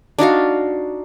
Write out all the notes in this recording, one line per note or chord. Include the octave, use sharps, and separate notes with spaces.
D4 D#4 F#4 F5